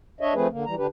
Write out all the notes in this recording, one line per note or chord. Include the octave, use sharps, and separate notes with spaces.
D4 C#5 D#5 E5
F3 A3 C4 G#4 B4
D3 A#3
E3 G3 A#5
D3 D4 G4 B4